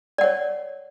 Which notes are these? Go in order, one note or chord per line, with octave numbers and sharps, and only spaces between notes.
C#5 D5 F#5